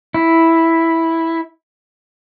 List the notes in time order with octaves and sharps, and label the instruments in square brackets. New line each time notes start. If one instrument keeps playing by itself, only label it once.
[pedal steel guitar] E4